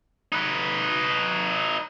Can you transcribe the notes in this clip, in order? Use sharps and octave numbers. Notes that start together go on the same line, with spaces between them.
D#4 B4